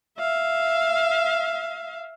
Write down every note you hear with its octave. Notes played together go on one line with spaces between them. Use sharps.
E5 F5